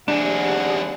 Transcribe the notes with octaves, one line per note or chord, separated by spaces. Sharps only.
D#2 C3 G3 D4 G#4 F#5